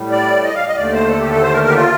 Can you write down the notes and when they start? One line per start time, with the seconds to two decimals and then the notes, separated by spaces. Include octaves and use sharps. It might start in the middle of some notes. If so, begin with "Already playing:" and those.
Already playing: A2 G3
0.11 D5
0.44 D#5
0.55 F5
0.67 D#5
0.76 D#2 D3 A3 D5
0.93 C5
1.09 A4
1.20 G4
1.31 A4
1.42 C5
1.53 A#4
1.63 A#4
1.69 G4
1.74 F4